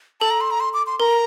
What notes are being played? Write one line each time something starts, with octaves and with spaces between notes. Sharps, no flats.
A4 A5
A#5
C6
A#5
C6
D6
C6
A#4 A#5